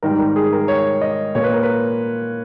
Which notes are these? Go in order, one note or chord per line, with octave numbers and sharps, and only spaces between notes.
G#2 D#3 G3 A#4
A#4
G#4
A#4
C#5
D#5
A#2 A#3 C#5
B4
A#4
B4